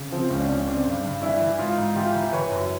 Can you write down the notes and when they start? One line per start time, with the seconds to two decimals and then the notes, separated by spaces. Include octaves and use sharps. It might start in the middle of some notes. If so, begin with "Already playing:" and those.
Already playing: C#3
0.12 F3 C4
0.30 C#2 C#4
0.40 D4
0.49 C#2 C#4
0.67 C#3 C4 D4
0.86 G2
1.04 G2
1.22 E3 D4 E4
1.41 E3
1.59 G#2 D#4 F4
1.78 G#2
1.95 E3 F4 G4
2.14 E3
2.33 E3 B4 C#5
2.51 F#2